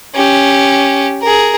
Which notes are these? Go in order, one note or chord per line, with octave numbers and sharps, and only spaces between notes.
C#4 G4
G#4 A#4